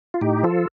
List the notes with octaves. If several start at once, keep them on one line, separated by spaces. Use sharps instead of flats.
F4
A2 D#4 G4
F3 F4 A4